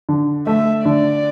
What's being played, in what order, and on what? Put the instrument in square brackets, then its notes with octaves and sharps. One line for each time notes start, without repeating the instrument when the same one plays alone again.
[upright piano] D3
[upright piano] A3 [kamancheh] E5
[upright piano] D3 [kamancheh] D5